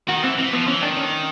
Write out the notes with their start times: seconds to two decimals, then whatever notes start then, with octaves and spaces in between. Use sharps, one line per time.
0.09 D#3 F#4
0.23 E3 C4
0.38 E3 C4
0.53 F3 B3
0.67 E3 C#4
0.82 D#3 D4
0.97 C#4